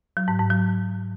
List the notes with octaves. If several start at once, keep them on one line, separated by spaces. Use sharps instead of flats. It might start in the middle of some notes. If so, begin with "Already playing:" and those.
F#3
G#2
G#2
F#3